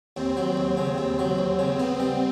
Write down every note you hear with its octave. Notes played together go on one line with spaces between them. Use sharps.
D#2 C4
F#3
D#2
C#3
D#2 C4
F#3
D#2
C#3
B3 C4
G3